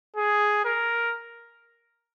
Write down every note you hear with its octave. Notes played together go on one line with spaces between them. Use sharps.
G#4
A#4